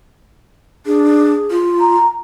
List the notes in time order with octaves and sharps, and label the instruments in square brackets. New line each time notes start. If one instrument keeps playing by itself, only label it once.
[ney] D4 [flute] G#4
[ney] F4
[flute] A#5